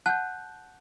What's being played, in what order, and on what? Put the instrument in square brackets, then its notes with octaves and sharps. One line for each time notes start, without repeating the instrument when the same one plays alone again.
[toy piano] F#5 A5 [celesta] F#6 G6